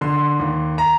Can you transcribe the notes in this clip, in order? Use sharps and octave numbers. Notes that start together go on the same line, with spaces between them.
D3 C6
D#2
A#5